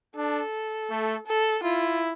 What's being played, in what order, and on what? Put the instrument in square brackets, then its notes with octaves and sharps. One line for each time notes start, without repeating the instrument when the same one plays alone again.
[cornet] D4 [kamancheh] A4
[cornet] A3
[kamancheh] A4
[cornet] E4 [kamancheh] F4